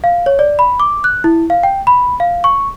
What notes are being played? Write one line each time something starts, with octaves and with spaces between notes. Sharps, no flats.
F5
C#5
D5
B5
D6
F#6
E4
F5
G5
B5
F5
C#6